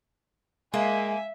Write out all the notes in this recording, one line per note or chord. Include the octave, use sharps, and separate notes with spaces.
G#3 A#3 E5 G#5